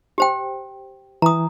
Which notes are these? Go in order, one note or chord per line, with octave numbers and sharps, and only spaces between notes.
G4 C5 G5
E3 A#5 D#6